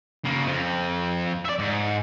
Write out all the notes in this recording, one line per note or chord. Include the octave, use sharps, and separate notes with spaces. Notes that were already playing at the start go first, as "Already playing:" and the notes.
C#3 A#3
F2 F3
D5 E5
G#2